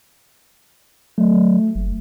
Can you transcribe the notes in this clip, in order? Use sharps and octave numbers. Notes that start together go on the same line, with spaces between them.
F#3 A3
F#1